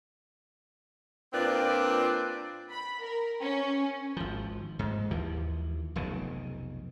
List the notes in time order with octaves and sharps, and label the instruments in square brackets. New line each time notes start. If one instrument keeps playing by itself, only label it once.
[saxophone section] A#2 C4 D4 B4 D5
[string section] B5
A#4
C#4
[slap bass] G#1 F3
G#2
D#2 E3 F3
F1 B1 C#3